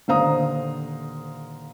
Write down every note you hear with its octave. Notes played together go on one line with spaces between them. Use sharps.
D#1 D3 C5 F5 A#5 D#6